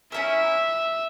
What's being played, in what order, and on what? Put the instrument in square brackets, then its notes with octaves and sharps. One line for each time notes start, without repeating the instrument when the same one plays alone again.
[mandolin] C#4 E4 A#4 [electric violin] E5